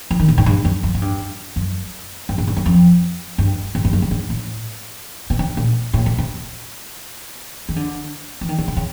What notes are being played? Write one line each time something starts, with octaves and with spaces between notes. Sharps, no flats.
E3
D#3
A2
G#2
G2
F#2
F#2
G#2
G2
F#2
G2
G#2
G2
F#2
F2
G2
G#2
G2
F#2
G2
G#2
A2
B2
C3
A#2
A2
B2
C3
D#3
D3
E3
D#3
D3
C3
C#3